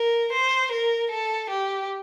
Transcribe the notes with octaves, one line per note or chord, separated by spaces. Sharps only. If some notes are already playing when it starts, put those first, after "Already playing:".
Already playing: A#4
C5
A#4
A4
G4